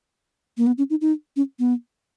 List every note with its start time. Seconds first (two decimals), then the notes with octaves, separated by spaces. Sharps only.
0.57 A#3
0.67 B3
0.78 C#4
0.90 D#4
1.01 D#4
1.36 C#4
1.59 B3